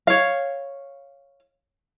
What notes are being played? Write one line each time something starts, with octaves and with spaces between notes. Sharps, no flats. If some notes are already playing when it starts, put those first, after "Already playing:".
C#5 F5